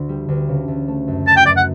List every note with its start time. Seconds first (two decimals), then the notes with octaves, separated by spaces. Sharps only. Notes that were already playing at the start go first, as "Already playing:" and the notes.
Already playing: D2 D3
0.09 G3
0.29 D2
0.49 C#3
0.68 D2
0.88 A3
1.08 F#2
1.26 E4 A5
1.36 G5
1.46 F#2 D5
1.56 F#5